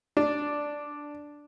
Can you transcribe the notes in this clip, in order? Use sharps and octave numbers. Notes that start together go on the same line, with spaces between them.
D4